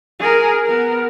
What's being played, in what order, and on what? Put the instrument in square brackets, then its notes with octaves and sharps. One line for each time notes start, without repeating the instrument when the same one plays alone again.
[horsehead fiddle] G#4 A#4
B3 A#4